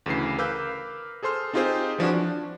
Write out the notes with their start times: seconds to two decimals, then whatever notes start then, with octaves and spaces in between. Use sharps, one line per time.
0.06 D2 C#3 E3 C7
0.38 A#4 B4 F5 D6 E6 G6
1.23 G#4 A4 C5 C6 F6
1.53 C4 D#4 F4 G4 G#4 C5
1.98 E3 F3 D4 F#4
2.13 D4